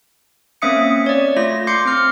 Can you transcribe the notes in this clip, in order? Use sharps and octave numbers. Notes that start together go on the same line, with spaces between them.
A#3 C4 C#4 E5 D#6 C#7
C#5 D5
A3 F4 A#6
C6 D6 G6 C7 C#7
C4 F6